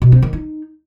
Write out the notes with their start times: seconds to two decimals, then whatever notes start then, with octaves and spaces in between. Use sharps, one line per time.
0.02 B2
0.12 C4
0.22 D#3
0.33 D#4